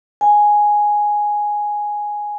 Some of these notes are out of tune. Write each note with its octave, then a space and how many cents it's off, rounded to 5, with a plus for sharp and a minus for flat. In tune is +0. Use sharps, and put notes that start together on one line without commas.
G#5 +0